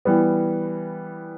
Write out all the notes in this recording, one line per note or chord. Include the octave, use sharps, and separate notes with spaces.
E3 G3 B3